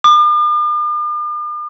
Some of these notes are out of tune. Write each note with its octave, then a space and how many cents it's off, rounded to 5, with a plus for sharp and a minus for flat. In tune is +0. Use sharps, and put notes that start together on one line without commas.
D6 +45